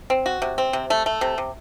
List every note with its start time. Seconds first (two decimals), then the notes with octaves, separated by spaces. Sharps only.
0.10 C4
0.26 F#4
0.42 C3
0.58 C4
0.73 C3
0.90 A3
1.06 A3
1.21 C3
1.38 C3